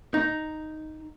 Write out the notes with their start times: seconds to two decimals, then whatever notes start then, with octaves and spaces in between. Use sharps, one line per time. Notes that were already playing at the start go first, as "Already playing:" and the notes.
0.14 D#4